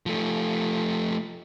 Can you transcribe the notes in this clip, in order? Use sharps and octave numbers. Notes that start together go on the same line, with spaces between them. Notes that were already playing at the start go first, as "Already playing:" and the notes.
F3 A3